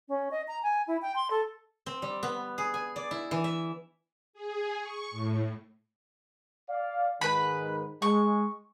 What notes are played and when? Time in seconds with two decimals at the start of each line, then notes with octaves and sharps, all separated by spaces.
0.08 C#4
0.31 D#5
0.48 A#5
0.63 G#5
0.87 E4
1.02 G5
1.15 C6
1.30 A4
1.86 C4
2.02 G3
2.23 B3
2.58 G#4
2.74 G#5
2.96 D5
3.11 E4
3.31 E3
3.44 E5
4.33 G#4
4.78 C#6
5.11 A2
6.69 D5 F5
7.21 G#2 D#3 B4 B5
8.02 G#3 C#6